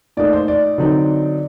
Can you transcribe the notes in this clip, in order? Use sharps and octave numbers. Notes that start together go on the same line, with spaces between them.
A#2 A3 D#4 D5
C5
D5
D3 F#3 C4 D#4